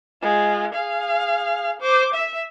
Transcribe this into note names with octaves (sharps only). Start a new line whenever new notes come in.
G#3 F4
G#4 F5
C5 D6
E5